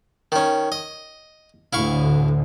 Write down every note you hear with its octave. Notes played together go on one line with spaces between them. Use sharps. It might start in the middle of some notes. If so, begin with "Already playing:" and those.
D#3 C#4
D#5
D2 A2 D3 E4 F5 C#6